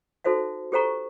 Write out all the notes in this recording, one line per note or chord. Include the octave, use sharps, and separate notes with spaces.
D#4 F#4 A4 C5 E5 F#5
G4 A4 C5 F#5 A#5 C#6